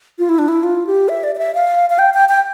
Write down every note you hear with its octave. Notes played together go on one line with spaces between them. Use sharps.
F4
E4
D4
E4
F4
G4
E5
D5
D5
E5
F5
F5
G5
G5
G5